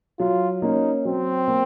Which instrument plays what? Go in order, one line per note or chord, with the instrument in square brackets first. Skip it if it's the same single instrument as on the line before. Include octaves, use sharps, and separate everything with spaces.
[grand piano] F#3 [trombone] F4
[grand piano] A#3 C#4 [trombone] D#4
[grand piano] F#3 [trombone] C4
[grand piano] A#3